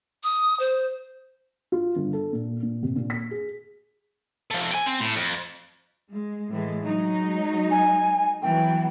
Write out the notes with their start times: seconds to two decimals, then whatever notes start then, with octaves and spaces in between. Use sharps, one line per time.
0.24 D#6
0.60 C5
1.72 F4
1.96 G1
2.13 A4
2.32 A#2
2.62 A#2
2.83 C3
2.96 A#2
3.10 B6
3.31 G#4
4.51 F3 A3
4.71 G5 G#5
4.86 C4
5.00 A2
5.15 F2
6.10 G#3
6.50 A2 E3 G#3
6.82 F#3 G#3 D#4
7.71 G#5
8.42 E3 F#3 B3 G5